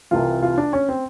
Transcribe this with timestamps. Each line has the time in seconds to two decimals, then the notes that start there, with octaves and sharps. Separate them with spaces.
0.11 C2 C3 E3 F4
0.42 F4
0.58 D4
0.73 C#4
0.89 C4